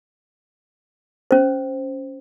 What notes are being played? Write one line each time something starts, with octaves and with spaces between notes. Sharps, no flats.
C#4 C5